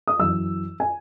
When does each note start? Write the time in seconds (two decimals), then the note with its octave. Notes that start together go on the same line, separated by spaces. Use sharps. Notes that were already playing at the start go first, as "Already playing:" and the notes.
0.08 D#6
0.19 F#2 E3 E6
0.80 G#5